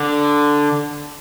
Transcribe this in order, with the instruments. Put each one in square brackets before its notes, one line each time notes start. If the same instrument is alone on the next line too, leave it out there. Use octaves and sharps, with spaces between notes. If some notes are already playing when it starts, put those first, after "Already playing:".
Already playing: [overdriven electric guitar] D3